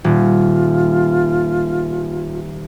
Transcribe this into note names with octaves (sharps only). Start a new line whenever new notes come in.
D#1 F4